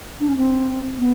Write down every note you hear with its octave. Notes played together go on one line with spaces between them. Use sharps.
D4
C#4
C4
B3